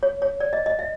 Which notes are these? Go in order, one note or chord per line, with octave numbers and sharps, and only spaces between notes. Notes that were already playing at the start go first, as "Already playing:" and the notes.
C#5
C#5
D5
D#5
D#5
E5